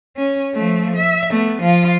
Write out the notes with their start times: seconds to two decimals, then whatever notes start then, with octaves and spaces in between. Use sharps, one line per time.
0.17 C#4
0.54 F3 A3
0.97 E5
1.30 A3 B3
1.62 F3 F4